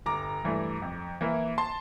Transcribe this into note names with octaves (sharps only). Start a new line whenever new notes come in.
G1 A#5 D6
G2 E3 A3
F2
E3 A#3 E4
A5 C6